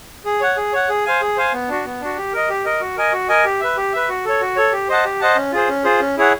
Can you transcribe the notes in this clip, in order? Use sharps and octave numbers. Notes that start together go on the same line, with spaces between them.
G#4
C#5 F#5
G#4
C#5 F#5
G#4
C5 F5 G#5
G#4
C5 F5 G#5
B3
D4 F#4
B3
D4 F#4
G4
A#4 D#5
G4
A#4 D#5
F#4
A#4 D#5 G#5
F#4
A#4 D#5 G#5
G4
B4 E5
G4
B4 E5
F#4
A4 C#5
F#4
A4 C#5
G4
C5 D#5 F#5 A5
G4
C5 D#5 F#5 A5
C#4
F4 G#4 C5
C#4
F4 G#4 C5
C#4
E4 G#4 C#5 F#5